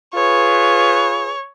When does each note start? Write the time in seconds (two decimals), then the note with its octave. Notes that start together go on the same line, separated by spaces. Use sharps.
0.14 F4 G#4 B4 C#5